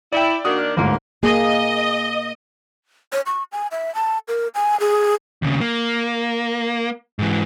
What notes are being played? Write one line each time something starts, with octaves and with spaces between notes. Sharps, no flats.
E4 D5 E5 G5
D#3 A#3 D4 F#4 D#6
F6
G1 D2 G#2 A#3
A#3 G#4 D#5
C#5
C#6
G#5
E5
A5
A#4
G#5
G#4
D#2 C#3
A#3
G#2 E3